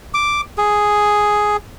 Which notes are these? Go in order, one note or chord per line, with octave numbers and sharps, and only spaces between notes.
D6
G#4